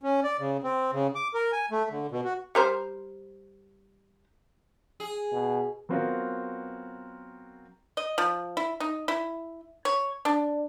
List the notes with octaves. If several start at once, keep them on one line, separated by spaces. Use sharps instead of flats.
C#4
D5
C#3
C4
C#3
D6
A#4
G#5
A3
D3
B2
F#4
G3 A#4 C5
G#4
B2
F#3 B3 C4 F4 F#4 A#4
D#5
F3
E4
D#4
E4
C#5
D4